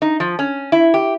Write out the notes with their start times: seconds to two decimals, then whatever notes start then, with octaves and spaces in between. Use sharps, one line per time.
0.02 D#4
0.20 F3
0.39 C#4
0.72 E4
0.94 G4